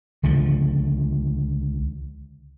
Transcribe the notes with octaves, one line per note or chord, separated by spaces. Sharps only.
C#2 D3 F3